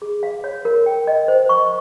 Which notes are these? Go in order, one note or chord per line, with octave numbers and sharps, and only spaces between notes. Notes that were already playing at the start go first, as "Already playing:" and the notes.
G#4
F5
C#5
A#4
G5
D#5
C5
C#6